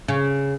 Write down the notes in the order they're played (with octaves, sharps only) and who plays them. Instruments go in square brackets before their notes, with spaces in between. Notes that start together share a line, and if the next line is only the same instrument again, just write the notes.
[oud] C#3